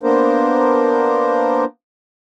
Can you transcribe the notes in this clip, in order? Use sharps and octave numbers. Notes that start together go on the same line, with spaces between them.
A#3 B3 D4 A#4 C5